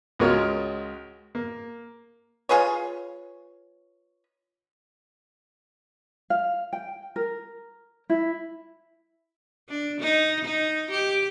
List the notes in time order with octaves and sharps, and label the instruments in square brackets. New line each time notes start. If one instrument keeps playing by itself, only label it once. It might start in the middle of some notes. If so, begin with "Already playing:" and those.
[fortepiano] C#2 G#3 F4 F#4 A#4 C#5
A#3
[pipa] F4 G#4 B4 C#5
[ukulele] F5
G5
A#4
E4
[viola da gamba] D4
D#4
D#4
G4